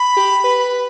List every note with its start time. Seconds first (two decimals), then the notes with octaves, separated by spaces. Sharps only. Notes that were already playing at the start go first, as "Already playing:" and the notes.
Already playing: B5
0.17 G4
0.44 B4